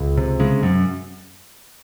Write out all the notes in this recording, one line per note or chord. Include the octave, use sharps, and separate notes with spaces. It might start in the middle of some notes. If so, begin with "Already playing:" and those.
Already playing: C#2
C3
C#3 G#3
F#2